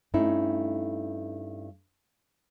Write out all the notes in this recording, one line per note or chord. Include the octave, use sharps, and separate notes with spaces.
G2 A3 C#4 D#4 E4